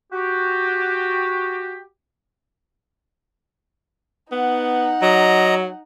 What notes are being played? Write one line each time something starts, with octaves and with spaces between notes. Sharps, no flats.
F#4 G4
B3 D#4 F#5
F#3 D#5 A#5